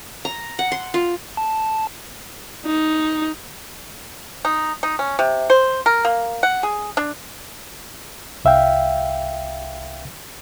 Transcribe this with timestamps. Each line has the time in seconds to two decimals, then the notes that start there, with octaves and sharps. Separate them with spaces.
0.25 A#5
0.59 F#5
0.72 C6
0.94 F4
1.37 A5
2.66 D#4
4.45 D#4
4.83 D#4
4.99 C#4
5.19 C3
5.50 C5
5.86 A#4
6.05 A#3
6.43 F#5
6.63 G#4
6.97 D4
8.45 C2 E5 F5 G5